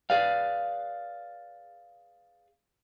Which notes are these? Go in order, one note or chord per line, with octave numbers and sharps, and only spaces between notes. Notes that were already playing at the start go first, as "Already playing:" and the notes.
G#4 B4 D5 F5